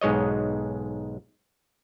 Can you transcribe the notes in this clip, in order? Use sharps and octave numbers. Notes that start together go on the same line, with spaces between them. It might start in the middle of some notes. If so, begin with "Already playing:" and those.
B1 G#2 G#3 C#5 D#5